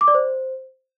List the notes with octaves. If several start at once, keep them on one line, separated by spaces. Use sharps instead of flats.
D6
D5
C5